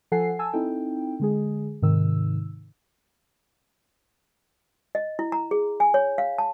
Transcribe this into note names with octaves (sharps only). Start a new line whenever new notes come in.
F3 A4 F#5 G#5 C7
G#5 A5 E6
C4 D#4 E4 A4 G5
D3 G#3 G#4
G#2 C3 D#3 E6
D#5
E4
A#5
G#4
G#5
C#5
F5
A5